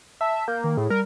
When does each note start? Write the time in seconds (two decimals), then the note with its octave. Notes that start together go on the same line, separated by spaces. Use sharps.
0.21 E5 A5
0.48 A#3 G6
0.64 D#3
0.78 A2 G#4
0.90 G3 A#4